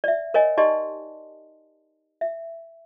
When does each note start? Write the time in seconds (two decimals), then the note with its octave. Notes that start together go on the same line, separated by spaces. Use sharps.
0.04 D5 E5
0.34 A#4 C#5 D#5 G#5
0.57 D#4 G4 D5 D#5 A5 C6
2.21 E5